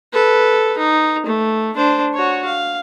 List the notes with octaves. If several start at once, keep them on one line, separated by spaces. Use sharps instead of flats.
A4 B4
D#4
A3
D4 C5
F#4 C#5
F5